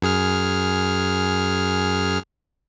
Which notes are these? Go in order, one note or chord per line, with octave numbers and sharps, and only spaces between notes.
F#2 G#4 F6